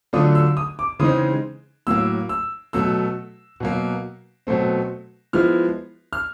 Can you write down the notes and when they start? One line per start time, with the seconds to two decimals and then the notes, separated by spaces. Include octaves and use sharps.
0.13 D3 F#3 A3 D4 F4 D#6
0.35 E6
0.57 D#6
0.79 D6
1.00 C#3 E3 G#3 C4 D#4 D#6
1.87 A2 F#3 A#3 E6
2.29 E6
2.73 B2 F#3 A3 E6
3.60 B2 F#3 A#3
4.47 B2 F#3 A3 C4
5.33 F3 G#3 B3 E4 F6
6.13 F6